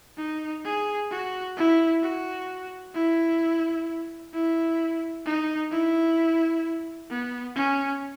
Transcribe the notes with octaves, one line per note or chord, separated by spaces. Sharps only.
D#4
G#4
F#4
E4
F#4
E4
E4
D#4
E4
B3
C#4